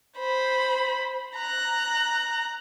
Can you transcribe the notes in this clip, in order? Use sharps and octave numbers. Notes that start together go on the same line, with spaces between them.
C5 B5
A#5 F#6